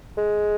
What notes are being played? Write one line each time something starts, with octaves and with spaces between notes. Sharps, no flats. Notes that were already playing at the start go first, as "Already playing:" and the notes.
G#3